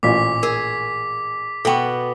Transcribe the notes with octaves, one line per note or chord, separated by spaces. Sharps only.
A1 A#2 D6 B6
G#4 A#4
B2 B3 A4 G5 C#6